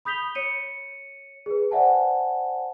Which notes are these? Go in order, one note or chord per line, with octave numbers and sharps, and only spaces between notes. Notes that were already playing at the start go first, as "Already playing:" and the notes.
B5 D#6 G6 B6 F7 G7
C#5 C#7 D#7
G#4 B4
C5 D5 E5 F#5 G#5 A5